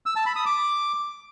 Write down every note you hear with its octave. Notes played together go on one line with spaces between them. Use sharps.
E6
A5
B5
D#6
D6